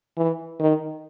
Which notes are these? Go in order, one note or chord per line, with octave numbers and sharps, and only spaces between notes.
E3
D#3